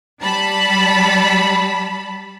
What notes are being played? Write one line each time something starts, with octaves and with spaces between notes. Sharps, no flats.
G3 A5 B5